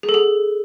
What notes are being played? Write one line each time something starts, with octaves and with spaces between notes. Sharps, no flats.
G#4
A4
G#4